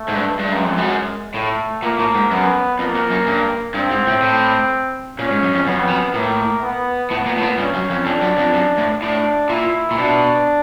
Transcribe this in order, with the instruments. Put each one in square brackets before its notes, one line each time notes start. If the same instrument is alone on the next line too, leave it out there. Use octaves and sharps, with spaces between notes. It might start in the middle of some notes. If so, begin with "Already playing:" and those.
Already playing: [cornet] A3
[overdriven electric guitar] G#2
G2
[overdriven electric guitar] G2 [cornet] G#3
[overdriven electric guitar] F#2
F2
F#2
[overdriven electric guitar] A2 [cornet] A3
[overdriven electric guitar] A#2 [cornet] A#3
[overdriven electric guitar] A2
G#2
[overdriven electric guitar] F#2 [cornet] B3
[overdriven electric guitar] F2 [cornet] A#3
[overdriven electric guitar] F2
F#2
G2
[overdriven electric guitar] G2 [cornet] C4
[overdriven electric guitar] G#2
A2
A2
[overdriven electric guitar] A#2 [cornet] C#4
[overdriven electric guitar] G#2
F#2
F2
[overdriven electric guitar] F#2 [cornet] B3
[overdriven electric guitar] F2
F#2
[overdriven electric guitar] A2 [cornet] A#3
[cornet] B3
[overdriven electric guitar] A2 [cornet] B3
[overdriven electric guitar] A#2
A2
A#2
[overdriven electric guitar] G2 [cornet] C#4
[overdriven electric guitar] F#2
F2
[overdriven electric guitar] F2 [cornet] D4
[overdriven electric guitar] F#2
F2
F#2
A2
[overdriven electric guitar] A2 [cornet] D4
[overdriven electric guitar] A#2 [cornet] E4
[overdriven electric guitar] A#2
[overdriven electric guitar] B2 [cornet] D4